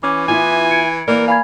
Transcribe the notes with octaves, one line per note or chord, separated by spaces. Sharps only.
E3 C#4 D6
B3 E4 F4 G#5
G#6 C#7 D7
E3 A#3 A#4 D5
F5 G#5 B5 G#6